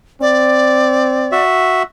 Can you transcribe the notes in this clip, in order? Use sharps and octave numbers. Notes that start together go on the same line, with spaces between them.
C4 D5
F#4 E5